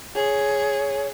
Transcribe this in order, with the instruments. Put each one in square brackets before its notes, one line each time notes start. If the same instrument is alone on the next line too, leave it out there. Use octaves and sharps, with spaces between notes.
[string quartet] G#4 [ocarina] C#5